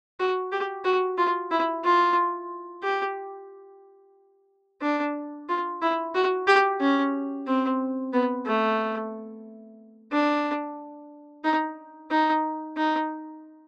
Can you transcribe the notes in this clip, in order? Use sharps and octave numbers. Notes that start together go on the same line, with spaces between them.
F#4
G4
F#4
F4
E4
F4
G4
D4
F4
E4
F#4
G4
C#4
C4
B3
A3
D4
D#4
D#4
D#4